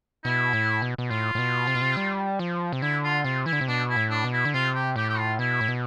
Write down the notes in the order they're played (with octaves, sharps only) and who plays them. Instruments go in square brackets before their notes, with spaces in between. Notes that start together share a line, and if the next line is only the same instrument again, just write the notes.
[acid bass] B2 [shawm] E4
[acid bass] A2
B2
B2
[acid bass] A2 [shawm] F4
[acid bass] A2
B2
C3
B2
C3
G3
F3
C3
[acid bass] D3 [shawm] E4
[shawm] F4
[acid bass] C3 [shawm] F4
[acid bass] E3 [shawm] E4
[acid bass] D3
C3
[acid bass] B2 [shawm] D4
[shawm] E4
[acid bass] A2
[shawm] D4
[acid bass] B2
[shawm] E4
[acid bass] D3
[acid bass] C3 [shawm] F4
[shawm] G4
[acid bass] A2 [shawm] G4
[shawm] G4
F4
[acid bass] B2 [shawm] E4
[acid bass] A2
B2